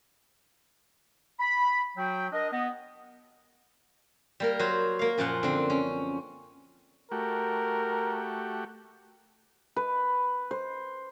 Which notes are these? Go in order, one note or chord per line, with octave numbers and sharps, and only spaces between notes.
B5
F#3 F#4 G5
D4 A#4 D#5
B3 D#5
G3 A#3 A#4
F#3 F#4 C5
A#3 F5
F#2 A#2 F3 F4 F#5
D3 C4
C#4
A3 F#4 G4 A#4
B4
C5